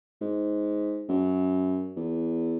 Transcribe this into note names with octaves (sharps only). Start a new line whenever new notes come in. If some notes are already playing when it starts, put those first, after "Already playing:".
G#2
F#2
E2